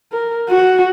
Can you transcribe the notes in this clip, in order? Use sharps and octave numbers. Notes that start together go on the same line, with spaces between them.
A#4
F#4